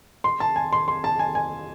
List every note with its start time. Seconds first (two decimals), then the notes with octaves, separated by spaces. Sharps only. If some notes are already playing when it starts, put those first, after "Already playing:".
0.24 C6
0.40 A5
0.56 G#5
0.72 C6
0.88 C6
1.04 A5
1.19 G#5
1.35 G#5